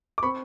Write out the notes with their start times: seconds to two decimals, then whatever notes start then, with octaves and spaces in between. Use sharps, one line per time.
0.18 D6
0.23 C4 B5 C#6